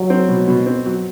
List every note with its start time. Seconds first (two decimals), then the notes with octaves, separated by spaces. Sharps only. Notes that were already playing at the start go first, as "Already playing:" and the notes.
Already playing: F#3
0.10 C4
0.29 B2
0.48 B2
0.66 C4
0.86 F#3